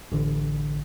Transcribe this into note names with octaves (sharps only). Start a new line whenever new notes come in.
A1 D3